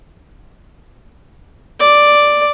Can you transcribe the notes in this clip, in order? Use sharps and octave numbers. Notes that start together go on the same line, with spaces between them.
D5